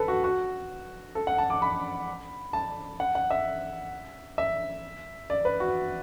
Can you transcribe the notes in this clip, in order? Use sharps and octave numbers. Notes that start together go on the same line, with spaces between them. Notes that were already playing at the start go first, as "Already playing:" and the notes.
Already playing: A4 B4
F#4
F#4
A4
F#5
A5
D6
B5
A5
F#5
F#5
E5
E5
D5
B4
F#4